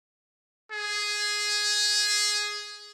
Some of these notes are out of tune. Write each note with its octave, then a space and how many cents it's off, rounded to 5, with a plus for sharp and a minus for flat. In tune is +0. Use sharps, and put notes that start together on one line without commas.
G#4 +0